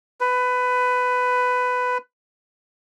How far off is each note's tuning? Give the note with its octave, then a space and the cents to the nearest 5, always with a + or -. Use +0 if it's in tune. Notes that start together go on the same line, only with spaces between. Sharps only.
B4 +15